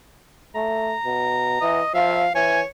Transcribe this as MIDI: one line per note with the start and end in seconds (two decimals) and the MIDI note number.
0.55 0.94 57
0.55 1.87 82
1.05 1.58 47
1.61 1.81 52
1.61 1.94 75
1.94 2.27 53
1.94 2.23 76
1.94 2.34 77
2.35 2.60 52
2.35 2.67 73
2.35 2.61 80